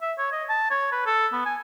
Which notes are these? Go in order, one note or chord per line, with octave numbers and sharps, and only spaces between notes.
E5
C#5
D#5
A5
C#5
B4
A4
B3
G#5